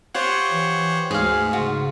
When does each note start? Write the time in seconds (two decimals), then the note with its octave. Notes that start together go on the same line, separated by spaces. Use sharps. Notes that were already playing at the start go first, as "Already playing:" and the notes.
0.15 F4 G4 C5 C#5 F#5
0.52 E3
1.11 D2 G#2 G#4 F5
1.53 C#3 F4 F#4